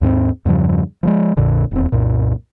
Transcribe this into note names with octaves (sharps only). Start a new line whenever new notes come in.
D#2 G#2 B3 C4
E2 G2 C#3 F3
F3 F#3 G#3
A#1 F2 A#2 D3
D#1 E2 C4
C2 F#2 A#2